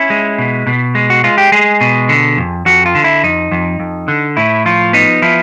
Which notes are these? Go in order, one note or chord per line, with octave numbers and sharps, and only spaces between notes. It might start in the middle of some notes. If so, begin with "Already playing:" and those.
Already playing: C#4 E4
G#3
B2
B2
G#3
F#4
G#3 F4
G4
G#3 G#4
B2
D3
F2
F2 F#4
F4
D3
E4
F2 D#4
F2
F2
D3
A2 E4
F3 F4
B3 D#4
F3 E4